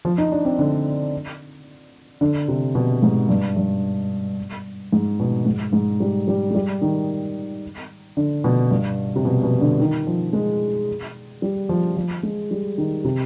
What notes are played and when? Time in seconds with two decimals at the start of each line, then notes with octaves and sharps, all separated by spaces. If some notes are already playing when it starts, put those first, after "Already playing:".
0.05 F3
0.18 D#4
0.32 D4
0.45 C4
0.59 D3
2.21 D3
2.48 C3
2.75 B2
3.02 G#2
3.29 G2
3.56 G2
4.92 G#2
5.20 B2
5.46 G#2
5.73 G#2
6.00 G3
6.28 G3
6.50 G#3
6.55 G3
6.82 D#3
8.17 D3
8.44 B2
8.71 G2
9.16 C3
9.25 B2
9.43 B2
9.61 D3
9.80 D#3
10.07 F3
10.33 G#3
11.42 G3
11.69 F3
11.97 F3
12.23 G#3
12.51 G3
12.78 D#3
13.05 C3